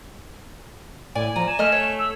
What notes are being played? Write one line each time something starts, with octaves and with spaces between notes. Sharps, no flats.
A2 D5 G#5
F3 A#5 D#7
G#5 E7
A3 D#5 F6
C#5
E6